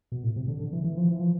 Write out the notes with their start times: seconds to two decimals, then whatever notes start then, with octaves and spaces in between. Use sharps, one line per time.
0.12 B2
0.24 A2
0.36 C3
0.48 D3
0.60 D3
0.73 E3
0.84 E3
0.97 F3
1.09 E3
1.20 F3